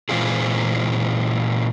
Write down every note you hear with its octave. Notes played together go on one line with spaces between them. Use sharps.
A#2 E3 G#3 C4 F4 G#4